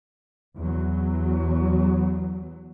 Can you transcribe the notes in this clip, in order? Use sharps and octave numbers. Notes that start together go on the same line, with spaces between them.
E2 F#3